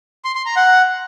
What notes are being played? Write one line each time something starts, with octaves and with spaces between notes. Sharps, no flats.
C6
C6
A#5
F#5